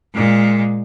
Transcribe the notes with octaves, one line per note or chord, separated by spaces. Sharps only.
A#2 G#3